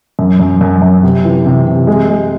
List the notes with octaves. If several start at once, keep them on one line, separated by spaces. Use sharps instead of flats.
F#2
F#2
F#2
F#2
C3
E3
C3
C3
G#3
G#3